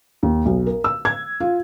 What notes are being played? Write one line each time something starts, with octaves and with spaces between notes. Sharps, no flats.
D#2
B1
A#4
E6
G#6
F4